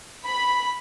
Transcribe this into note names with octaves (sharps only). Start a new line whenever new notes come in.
B5